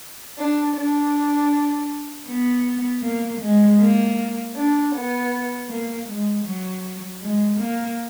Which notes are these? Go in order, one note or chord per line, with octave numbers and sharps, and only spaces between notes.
D4
D4
B3
A#3
G#3
A#3
D4
B3
A#3
G#3
F#3
G#3
A#3